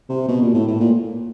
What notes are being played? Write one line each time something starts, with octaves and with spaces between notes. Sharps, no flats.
C3
B2
A#2
A2
A2
A#2